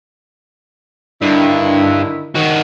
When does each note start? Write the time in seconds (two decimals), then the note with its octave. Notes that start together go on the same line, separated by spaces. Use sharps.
1.22 G2 D3 D#3 E4
2.35 D#3 F#4